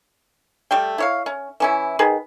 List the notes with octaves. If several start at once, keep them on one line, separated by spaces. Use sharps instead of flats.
G3 A3 G5
E4 C#5 F5
C#4
E3 C#4 E4
D#3 G#4 B4